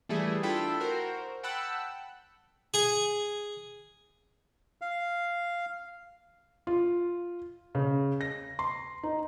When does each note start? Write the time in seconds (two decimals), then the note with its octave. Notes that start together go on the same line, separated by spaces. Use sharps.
0.09 E3 G3 A3 E4 G#4
0.43 D4 E4 F4 A4 G5 B5
0.80 F#4 A#4 C5
1.43 F#5 G5 A5 B5 E6 F#6
2.74 G#4 G#5
4.81 F5
6.67 F4
7.75 C#3
8.21 A#6
8.59 C6
9.03 D#4